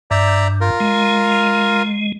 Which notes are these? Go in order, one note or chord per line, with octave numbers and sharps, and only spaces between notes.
G2 D5 E5 A#5
F4 A#4
G#3